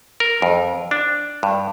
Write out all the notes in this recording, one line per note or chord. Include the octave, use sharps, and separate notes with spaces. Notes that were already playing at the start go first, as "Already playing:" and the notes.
A#4
F2
D4
G2